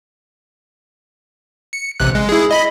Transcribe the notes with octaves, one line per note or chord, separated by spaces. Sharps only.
C#7
A1 C3 F#6
G#3
E4 G#4
D#5 B5 B6